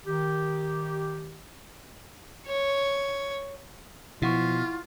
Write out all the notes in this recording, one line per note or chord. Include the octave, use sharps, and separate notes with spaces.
D#3 G4
C#5
B2 F3 E4 F4 F#5 C#6